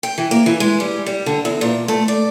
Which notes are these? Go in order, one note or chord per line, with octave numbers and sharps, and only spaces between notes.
G5
E3
A#3
E3
G#3
G3
G3
D3
E2
A#2
A3
D5